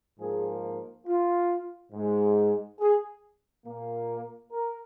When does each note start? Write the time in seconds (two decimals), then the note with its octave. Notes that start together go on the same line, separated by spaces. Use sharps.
0.19 G#2 F3 A#3 G#4
1.07 F4
1.92 G#2 G#3
2.80 G#4
3.65 A#2 A#3
4.52 A#4